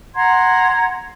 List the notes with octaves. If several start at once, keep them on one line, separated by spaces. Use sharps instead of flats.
F#5 A#5 C6 G#6